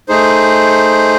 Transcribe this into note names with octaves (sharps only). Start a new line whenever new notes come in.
A3 D#4 G#4 C5